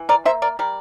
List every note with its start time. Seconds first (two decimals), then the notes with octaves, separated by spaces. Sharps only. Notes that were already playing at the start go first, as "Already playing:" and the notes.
Already playing: E3
0.09 A#4 D5
0.25 A#3 C5 E5
0.42 A#4 D5
0.59 G3 A#4 D5